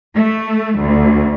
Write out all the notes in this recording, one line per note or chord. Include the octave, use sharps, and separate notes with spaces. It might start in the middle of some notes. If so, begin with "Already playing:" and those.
A3
D2